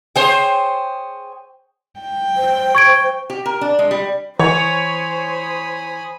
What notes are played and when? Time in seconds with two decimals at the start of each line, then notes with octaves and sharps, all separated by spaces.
0.16 G#4 C5 C#5 G5
2.00 G5
2.37 C5
2.75 C#6 G#6 D7
3.30 G4
3.46 A#4
3.61 D4
3.79 G#3
3.91 G3
4.39 E3 C5 C#5 G#5 B5 D#6